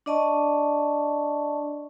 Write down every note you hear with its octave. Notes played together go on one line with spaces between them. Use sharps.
D4 D5 D#5 A5 C#6